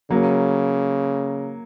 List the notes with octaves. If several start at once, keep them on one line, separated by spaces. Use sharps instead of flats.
C#3 F#3 A#3